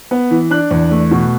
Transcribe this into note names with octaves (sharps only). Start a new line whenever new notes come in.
B3
E3
D4 F#6
E2
A3
B2